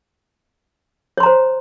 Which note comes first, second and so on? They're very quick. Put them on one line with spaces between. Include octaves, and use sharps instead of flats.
C#5 C6 A#5 C5